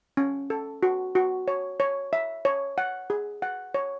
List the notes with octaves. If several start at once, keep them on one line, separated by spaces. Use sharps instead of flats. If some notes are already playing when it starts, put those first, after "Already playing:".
C#4
A4
F#4
F#4
C#5
C#5
E5
C#5
F#5
G#4
F#5
C#5